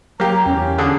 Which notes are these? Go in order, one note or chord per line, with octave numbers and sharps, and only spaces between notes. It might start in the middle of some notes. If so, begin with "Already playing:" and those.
F#3 A#3 G4 A#5
E2 C#4
D3 G#4